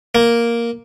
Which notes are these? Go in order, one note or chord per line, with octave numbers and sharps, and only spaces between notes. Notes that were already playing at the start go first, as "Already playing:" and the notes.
A#3